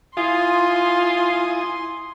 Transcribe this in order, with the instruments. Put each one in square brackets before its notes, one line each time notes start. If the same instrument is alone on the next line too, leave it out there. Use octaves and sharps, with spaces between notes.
[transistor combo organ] E4 G#5 D#6 [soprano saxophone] F4 [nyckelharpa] C6